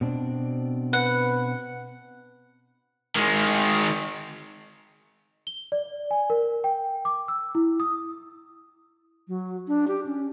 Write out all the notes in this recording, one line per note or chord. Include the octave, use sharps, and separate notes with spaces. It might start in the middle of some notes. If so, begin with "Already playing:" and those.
B2 C4 D4
B4 F#5
D#3 G#3
G7
D5
G#5
A#4
G5
D6
E6
E4
D#6
F#3
D4
G4
C#4